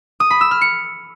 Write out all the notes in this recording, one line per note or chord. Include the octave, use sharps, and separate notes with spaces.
D#6
B5
E6
F6
C#7